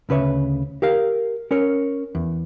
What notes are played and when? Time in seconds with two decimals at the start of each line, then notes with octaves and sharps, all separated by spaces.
0.09 D2 C#3 B4 C#5 E5
0.82 G4 A#4 F5
1.51 C#4 A#4 C#5
2.15 E2